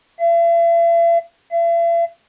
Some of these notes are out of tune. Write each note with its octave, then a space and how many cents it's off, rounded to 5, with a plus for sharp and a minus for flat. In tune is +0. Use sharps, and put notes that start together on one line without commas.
E5 +45
E5 +45